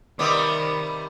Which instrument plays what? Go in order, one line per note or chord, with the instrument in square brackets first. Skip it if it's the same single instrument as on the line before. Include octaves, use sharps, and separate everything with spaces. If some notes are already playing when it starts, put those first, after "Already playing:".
[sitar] C3 G3 B3 [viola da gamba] D#3 [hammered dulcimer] D5 D#5